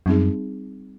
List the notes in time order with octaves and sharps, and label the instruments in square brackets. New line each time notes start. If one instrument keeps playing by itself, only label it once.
[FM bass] F#2 [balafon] G3 C4 D#4 G#4